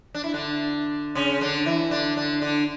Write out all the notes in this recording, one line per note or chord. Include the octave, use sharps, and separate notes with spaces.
D4
E4
D3 D4
C#3 C#4
D3 D4
E3 E4
D3 D4
D3 D4
D3 D4